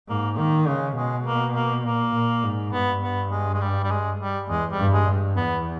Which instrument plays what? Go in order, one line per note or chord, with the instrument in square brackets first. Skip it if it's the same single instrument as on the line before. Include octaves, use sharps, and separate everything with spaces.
[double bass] G#2 [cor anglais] A#3
[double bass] D#3 [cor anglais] A#3
[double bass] C#3 [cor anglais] G#3
[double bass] B2 [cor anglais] G#3
[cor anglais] A#3
A#3
[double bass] A#2 [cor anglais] A#3
[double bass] A#2
G#2
[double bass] G2 [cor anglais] B3
[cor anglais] B3
G#3
G#3
G3
G3
G#3
G3
[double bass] E2 [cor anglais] G#3
[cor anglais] G3
[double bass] G2
[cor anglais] G#3
[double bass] G2
[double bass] E2 [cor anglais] B3